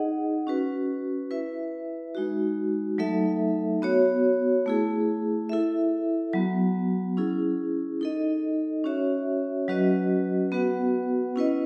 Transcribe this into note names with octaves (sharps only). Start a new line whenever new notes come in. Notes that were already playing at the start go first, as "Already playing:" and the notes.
Already playing: D#4 G#4 D#5 F#5
C#4 F#4 B4
E4 B4 E5
G#3 D#4 F#4
F#3 A3 D#4 A4 E5
B3 F#4 C#5
A3 E4 G#4
E4 A4 E5
F#3 B3 F#4
C#4 E4 G#4
D#4 A4 D#5
C#4 F#4 C#5 E5
F#3 C#4 F#4 B4 D#5
B3 F#4 B4 F#5
C#4 E4 B4 D#5